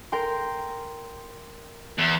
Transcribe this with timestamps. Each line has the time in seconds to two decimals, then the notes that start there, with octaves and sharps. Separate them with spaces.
0.12 A#4 G5 C6
1.98 E2